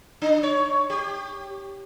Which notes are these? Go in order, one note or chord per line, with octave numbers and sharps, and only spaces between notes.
D4
C#5
G4